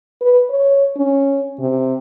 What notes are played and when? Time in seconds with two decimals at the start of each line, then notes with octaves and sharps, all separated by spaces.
0.21 B4
0.50 C#5
0.97 C#4
1.59 C3